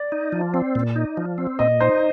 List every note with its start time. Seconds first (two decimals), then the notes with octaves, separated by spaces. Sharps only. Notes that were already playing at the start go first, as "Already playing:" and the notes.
Already playing: D5
0.12 D#4
0.32 F3
0.54 C4
0.75 A#2
0.96 D#4
1.17 F3
1.38 C4
1.59 A#2 D#5
1.80 D#4 C5